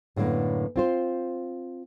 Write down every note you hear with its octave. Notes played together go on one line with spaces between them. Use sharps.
F#2 A2 D3 A#3 B3
C4 F4 C5